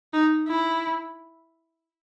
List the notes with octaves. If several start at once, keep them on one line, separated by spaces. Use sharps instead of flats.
D#4
E4